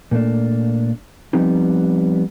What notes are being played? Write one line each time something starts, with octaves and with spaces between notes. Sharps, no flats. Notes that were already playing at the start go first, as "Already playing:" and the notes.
A#2 A3 A#3 D4
F3 G3 B3 C4 D#4